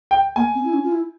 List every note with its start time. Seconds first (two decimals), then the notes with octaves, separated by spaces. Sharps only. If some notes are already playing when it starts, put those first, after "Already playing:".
0.11 G5
0.36 A#3 G#5
0.55 C4
0.65 E4
0.73 C#4
0.84 F4
0.92 E4